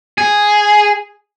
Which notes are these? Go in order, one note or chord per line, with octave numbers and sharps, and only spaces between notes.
G#4